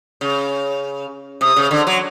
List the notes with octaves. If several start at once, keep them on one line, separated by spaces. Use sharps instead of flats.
C#3
C3 D#6
C#3
D3
F#3